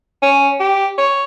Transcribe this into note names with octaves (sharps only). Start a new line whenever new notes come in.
C#4
G4
C#5